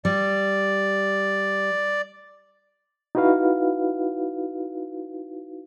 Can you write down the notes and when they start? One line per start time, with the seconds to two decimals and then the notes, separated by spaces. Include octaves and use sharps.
0.05 G3 D5
3.15 D#4 E4 F#4 B4 F5